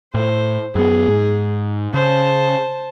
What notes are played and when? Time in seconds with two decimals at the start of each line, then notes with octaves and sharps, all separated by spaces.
0.14 A2 C5
0.75 F#2 B3 G#4
1.08 G#2
1.94 C#3 C5 A5